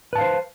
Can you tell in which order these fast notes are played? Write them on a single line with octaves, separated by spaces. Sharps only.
B4 A5 F5 C5